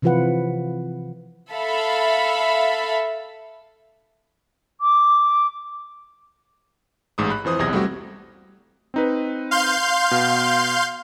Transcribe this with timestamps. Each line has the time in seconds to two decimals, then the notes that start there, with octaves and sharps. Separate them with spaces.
0.02 C3 E3 F3 F4 B4 F#5
1.52 A4 E5 F5 B5
4.81 D6
7.18 A1 G#2 D#6
7.30 B5 F#6
7.45 F2 E3 C5 D#6
7.59 B1 E2 C3 D#6 G#6 A#6
7.73 G3 A3 C4 F#4 G4
8.94 C4 D#4 B4
9.51 F5 C6 G6
10.11 B2